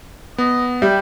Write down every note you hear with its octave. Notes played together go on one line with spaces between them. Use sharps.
B3 D#5
G3 E5 G5